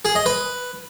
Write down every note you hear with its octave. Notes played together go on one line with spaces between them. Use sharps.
G#4
D#5
B4